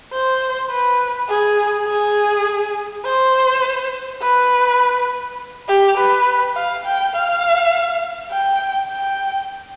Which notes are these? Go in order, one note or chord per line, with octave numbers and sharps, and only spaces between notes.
C5
B4
G#4
G#4
C5
B4
G4
B4
F5
G5
F5
G5
G5